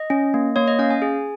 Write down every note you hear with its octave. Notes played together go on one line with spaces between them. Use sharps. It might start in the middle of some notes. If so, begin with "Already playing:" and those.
Already playing: D#5
C#4
A#3
A#3 C#5
D#5
C#4 F5
G#5
G#4